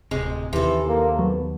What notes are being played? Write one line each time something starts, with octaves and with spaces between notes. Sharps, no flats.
D1 G#1 C3 G#3
D#2 C3 E3 A4
A#3
F#3 B3